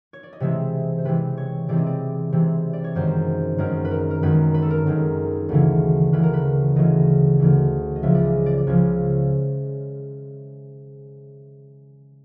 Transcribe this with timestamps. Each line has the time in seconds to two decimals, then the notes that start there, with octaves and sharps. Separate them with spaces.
0.13 C#5
0.23 D5
0.33 D#5
0.40 C3 E3 G#3 C4 E5
0.98 C5
1.05 C3 E3 G#3 C4 B4
1.38 C#5
1.68 C3 E3 G#3 C4 D5
1.78 D#5
1.86 D5
2.32 C3 E3 G#3 C4
2.73 D5
2.84 C#5
2.95 F#2 D#3 G#3 C5
3.58 F#2 D#3 G#3 A#4
3.85 B4
3.91 A#4
4.11 A#4
4.22 F#2 D#3 G#3 B4
4.54 B4
4.62 A4
4.70 A#4
4.86 F#2 D#3 G#3
5.49 D2 C#3 E3
6.13 D2 C#3 E3 B4
6.23 A#4
6.33 B4
6.76 D2 C#3 E3 D#5
7.39 D2 C#3 E3
7.96 D#5
8.03 C#2 C#3 F3 E5
8.14 D5
8.25 D#5
8.46 D5
8.57 D5
8.67 C#2 C#3 F3 C#5